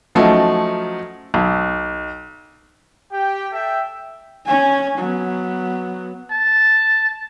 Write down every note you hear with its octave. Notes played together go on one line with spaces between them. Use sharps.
F3 F#3 A3 C#4 D#4
B1
G4 G5
A4 E5 G5
C#4 G#5
F#3 B3
A5